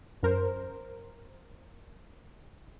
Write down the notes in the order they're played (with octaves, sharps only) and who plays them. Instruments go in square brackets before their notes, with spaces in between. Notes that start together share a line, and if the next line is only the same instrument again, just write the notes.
[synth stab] F#2 A#4 C5